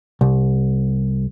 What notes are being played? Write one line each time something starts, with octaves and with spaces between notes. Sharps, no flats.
C2